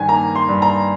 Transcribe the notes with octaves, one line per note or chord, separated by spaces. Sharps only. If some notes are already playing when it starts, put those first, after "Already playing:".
Already playing: G2 D#3 G#5
A#3 A#5
C6
G2
A#5